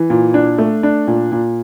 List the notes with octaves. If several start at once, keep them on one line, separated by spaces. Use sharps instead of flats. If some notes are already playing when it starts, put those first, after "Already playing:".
Already playing: E3
A#2
D4
A3
D4
A#2
A#2